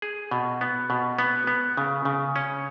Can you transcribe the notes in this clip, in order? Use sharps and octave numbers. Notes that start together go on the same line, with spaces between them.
G#4
B2
B3
B2
B3
B3
C#3
C#3
C#4